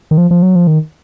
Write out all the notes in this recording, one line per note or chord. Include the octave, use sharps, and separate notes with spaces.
D#3
F3
F3
F#3
F3
D#3